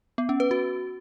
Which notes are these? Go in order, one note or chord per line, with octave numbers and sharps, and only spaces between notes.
B3
C#4
B4
F#4